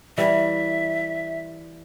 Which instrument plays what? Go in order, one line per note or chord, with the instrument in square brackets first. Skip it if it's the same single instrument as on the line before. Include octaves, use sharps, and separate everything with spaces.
[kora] E3 G3 [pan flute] E5